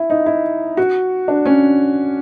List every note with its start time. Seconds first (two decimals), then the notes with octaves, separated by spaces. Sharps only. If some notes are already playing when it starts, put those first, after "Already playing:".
Already playing: E4
0.10 D#4
0.26 E4
0.77 F#4
1.28 D4
1.45 C#4